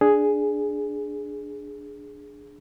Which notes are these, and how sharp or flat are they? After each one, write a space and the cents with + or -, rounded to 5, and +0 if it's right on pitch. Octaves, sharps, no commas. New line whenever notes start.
D4 +0 G#4 +0